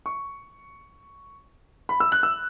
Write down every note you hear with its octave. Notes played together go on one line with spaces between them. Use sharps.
C#6
B5
E6
F#6
E6